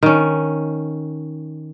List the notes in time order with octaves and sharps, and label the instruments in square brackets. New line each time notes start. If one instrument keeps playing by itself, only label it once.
[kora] D#3 C#4